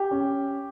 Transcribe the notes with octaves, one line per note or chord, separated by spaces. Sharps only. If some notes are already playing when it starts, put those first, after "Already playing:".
Already playing: G4
C#4